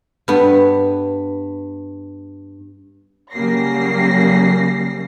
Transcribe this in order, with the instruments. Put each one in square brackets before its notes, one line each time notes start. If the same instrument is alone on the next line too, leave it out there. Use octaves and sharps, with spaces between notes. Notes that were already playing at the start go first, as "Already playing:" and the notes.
[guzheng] G2 B3
[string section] C#3 F#3 G3 A#3 A#6 C7